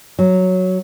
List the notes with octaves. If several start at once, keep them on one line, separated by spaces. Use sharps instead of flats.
F#3